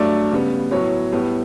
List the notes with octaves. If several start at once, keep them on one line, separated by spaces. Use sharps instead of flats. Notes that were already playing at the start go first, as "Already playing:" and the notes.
Already playing: G2 F#3 A3 D5
C#3 G3 B3
A2 F#3 B3 C#5
A2 G3 B3